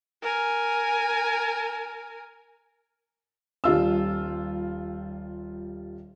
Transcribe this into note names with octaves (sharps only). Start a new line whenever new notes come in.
A#4 G#5
D#1 G3 F4 E6